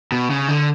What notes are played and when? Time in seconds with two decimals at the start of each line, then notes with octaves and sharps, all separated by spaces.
0.12 B2
0.30 C#3
0.48 D3